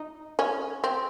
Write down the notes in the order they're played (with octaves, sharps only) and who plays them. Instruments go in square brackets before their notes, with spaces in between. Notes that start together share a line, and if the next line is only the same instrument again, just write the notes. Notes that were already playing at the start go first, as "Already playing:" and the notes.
Already playing: [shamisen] D#4
C#4
C4